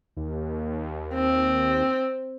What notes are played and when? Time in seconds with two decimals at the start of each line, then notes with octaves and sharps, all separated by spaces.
0.17 D#2
1.14 C4